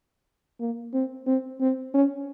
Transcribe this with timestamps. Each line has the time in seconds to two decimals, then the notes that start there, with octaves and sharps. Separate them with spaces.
0.60 A#3
0.93 C4
1.27 C4
1.61 C4
1.94 C#4